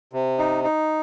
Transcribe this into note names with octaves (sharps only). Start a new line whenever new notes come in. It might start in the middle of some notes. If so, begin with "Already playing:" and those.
C3
D#4
D#4